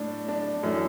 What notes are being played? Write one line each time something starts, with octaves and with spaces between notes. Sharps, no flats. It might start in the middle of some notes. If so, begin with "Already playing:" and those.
Already playing: A2 D4
D4
F#2 E3 A3